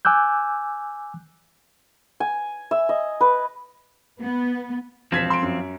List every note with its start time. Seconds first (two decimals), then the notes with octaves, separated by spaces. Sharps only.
0.05 G#5 D6 E6 F#6 G6
2.20 G#5
2.71 E5
2.89 D#5
3.21 B4
4.20 B3
5.12 E1 F3 C4 G#6 B6
5.30 C6 D7
5.43 F#2